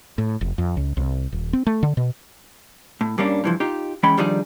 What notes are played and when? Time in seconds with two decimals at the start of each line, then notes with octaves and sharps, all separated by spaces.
0.18 A2
0.41 F1
0.58 F2
0.77 C#2
0.97 C2
1.32 D#1
1.53 C4
1.67 A3
1.83 D3
1.97 B2
3.01 A2
3.18 G2 G3 A#3 C#4 D4
3.44 G2 E3 F3
3.60 D#4 F4 G4
4.03 E3 G#3 C#4 G5 B5
4.17 D#3 F3 G3 D4 D#4 G#4